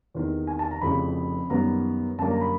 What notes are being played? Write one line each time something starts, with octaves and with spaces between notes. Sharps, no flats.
E2 C3 D#3
G#5
A5
A#5
F1 F2 C#3 E3 B5
F#2 D#3 G3 B3 A#5
F#2 D3 G3 A#3 D4 A5
A#5
B5